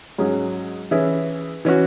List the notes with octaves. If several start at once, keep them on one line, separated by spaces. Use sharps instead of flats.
G#2 F#3 C#4 G#4
E3 C#4 E4 G#4
E3 C#4 F#4